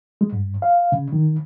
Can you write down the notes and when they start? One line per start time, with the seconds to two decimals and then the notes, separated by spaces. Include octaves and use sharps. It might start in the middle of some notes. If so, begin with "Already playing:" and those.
0.21 G#3
0.32 G2
0.62 F5
0.92 C#3
1.12 D#3